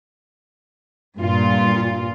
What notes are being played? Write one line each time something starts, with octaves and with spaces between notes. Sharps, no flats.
G2 A#2 F4